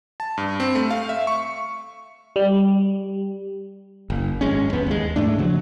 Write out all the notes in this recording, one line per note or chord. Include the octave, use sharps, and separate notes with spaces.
A5
G2
C4
A3
F5
E5
C#6
G3
F#1
G#1 G#3 C#4
E2 B3
D#2 G#3
G#2 A3 D4
C#3 F3 F#3